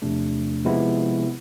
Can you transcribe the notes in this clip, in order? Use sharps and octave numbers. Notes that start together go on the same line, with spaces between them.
E2 C3 F3 A3 D4
C3 F3 G#3 B3 E4